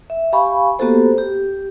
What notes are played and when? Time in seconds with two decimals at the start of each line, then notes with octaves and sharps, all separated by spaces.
0.10 E5
0.33 G4 F5 G#5 B5 C#6
0.79 A#3 B3 F#4 G4 A4 C5
1.18 G4